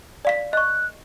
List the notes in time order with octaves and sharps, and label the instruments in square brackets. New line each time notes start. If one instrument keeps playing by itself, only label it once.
[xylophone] D5 F5 B6
[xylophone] D#5 C#6 [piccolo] F#6